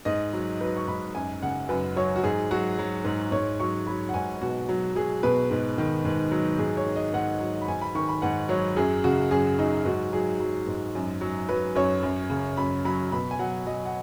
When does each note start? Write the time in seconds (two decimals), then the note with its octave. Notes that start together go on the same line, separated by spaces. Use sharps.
0.05 G#2 D#5
0.33 F#3
0.61 F#3 B4
0.77 C#6
0.87 G#2 B5
1.14 F#2 G#5
1.42 C#3 F#5
1.69 F#2 B4
1.96 F#3 C#5
2.16 F#4
2.24 G#2 G#4
2.51 F#3 F#4
2.79 F#3
3.05 G#2
3.32 G#2 C#5
3.60 F#3 C#6
3.87 F#3 B5
4.09 F#5
4.14 G#2 G#5
4.41 B2 F#4
4.69 F#3
4.95 F#3 G#4
5.23 B2 B4
5.50 G#2
5.78 D#3
6.05 G#2
6.31 F#3
6.58 G#2 G#4
6.77 C#5
6.87 D#3
6.96 D#5
7.13 G#2 F#5
7.40 F#3
7.61 B5
7.68 G#2 G#5
7.82 B5
7.95 D#3 C#6
8.09 B5
8.22 G#2 F#5
8.49 F#3 C#5
8.76 F#2 G#4
9.04 C#3 F#4
9.31 F#2 G#4
9.58 F#3 D#4
9.85 G#2 F#4
10.12 F#3 G#4
10.40 F#3
10.67 G#2
10.95 F#2
11.21 F#3
11.49 F#3 B4
11.75 F#2 C#5
12.03 F#2
12.30 C#3
12.57 F#2 B5
12.85 F#3 B5
13.12 B2 B5
13.31 G#5
13.39 F#3 F#5
13.67 F#3 D#5
13.85 F#5